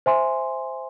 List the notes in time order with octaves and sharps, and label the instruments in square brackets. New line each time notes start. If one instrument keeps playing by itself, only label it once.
[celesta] C5 E5 G#5 C6